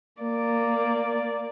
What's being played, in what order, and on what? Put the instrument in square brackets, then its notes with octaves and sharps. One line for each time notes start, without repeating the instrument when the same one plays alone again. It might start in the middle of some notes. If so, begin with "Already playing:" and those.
[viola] A#3 D5